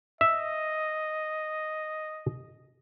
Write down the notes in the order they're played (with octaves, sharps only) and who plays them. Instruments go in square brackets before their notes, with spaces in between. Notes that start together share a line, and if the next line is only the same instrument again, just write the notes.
[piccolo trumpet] D#5 [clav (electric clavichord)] E5